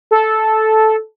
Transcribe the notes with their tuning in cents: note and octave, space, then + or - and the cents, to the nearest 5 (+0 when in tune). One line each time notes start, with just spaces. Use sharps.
A4 -10